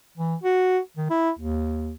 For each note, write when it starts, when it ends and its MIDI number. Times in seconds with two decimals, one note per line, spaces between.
0.17 0.35 52
0.44 0.79 66
0.97 1.08 51
1.10 1.30 64
1.39 1.91 39